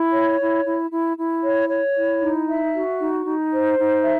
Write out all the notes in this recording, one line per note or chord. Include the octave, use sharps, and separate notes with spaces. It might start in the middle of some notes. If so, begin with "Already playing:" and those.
Already playing: E4
C#5
E4
E4
E4
E4
C#5
C#5
E4
D#4
E5
F#4
D#4
D#4
C5
D#4
E5